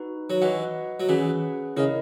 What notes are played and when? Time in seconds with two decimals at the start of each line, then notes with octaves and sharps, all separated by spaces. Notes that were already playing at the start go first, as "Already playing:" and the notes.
Already playing: D#4 F#4 B4
0.30 F#3
0.42 E3 F#4 B4 D#5 F#5
1.00 F#3
1.09 E3 C#4 G#4 B4 F#5
1.76 C#3 E4 A#4 D#5